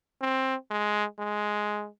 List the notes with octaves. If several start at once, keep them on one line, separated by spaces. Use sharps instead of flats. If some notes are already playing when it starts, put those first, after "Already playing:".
C4
G#3
G#3